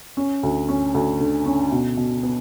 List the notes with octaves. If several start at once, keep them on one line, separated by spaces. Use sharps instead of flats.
C#4
D2
C#4
D2
D3
C#4
B2
B2
B3